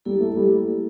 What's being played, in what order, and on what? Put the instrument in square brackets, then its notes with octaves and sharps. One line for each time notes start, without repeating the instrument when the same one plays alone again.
[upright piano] G3 [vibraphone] A#3 E4 A4
[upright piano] A3
G3